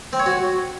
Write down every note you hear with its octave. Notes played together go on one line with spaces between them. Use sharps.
C4
C#5
F#4